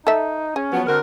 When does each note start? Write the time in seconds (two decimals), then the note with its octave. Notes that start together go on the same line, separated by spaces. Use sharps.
0.07 D#4 A4 E5
0.56 C#4 G#4
0.72 F3 F#3 B3
0.87 D3 C4 F#4 A#4